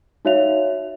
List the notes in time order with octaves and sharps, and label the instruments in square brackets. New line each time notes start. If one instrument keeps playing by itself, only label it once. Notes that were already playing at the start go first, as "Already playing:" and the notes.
[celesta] D#4 F#4 C#5 E5 F5 F7